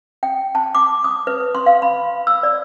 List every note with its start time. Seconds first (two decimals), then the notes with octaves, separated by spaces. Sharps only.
0.23 G5
0.55 A5
0.75 D6
1.04 D#6
1.27 B4
1.55 C6
1.66 F5
1.82 B5
2.27 E6
2.43 D5